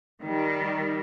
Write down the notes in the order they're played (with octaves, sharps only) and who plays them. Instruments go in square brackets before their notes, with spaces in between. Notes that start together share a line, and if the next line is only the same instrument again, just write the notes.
[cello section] D#3 G3